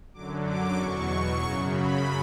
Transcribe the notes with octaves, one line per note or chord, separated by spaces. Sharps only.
F#2 D3 F#3 D6
D6
E2 B2 F#3 C#6
F#2 C#3 F#3 C#6
B5